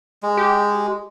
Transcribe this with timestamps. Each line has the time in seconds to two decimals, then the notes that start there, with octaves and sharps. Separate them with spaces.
0.23 G#3
0.37 G4